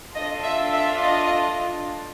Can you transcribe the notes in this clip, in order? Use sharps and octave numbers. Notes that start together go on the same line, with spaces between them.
D4 F4 A4 D#5
E5
E5
D#5